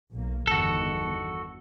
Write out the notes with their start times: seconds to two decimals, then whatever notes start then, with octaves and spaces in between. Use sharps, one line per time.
0.13 B1 A#3
0.47 G1 E2 D#3 F#4 A4